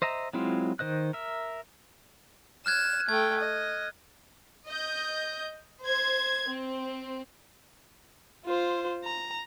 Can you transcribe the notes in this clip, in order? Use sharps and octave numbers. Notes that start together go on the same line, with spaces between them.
C5 D#5 E5 A#5
F#3 G#3 C4 E4 F4
D#3 C5 D#5 F#6
A#4 E5
F6 F#6 G#6 E7
A3 G5 G#6
D#5
D#5 G6
C5 G#6
C4
F4 C5
A#5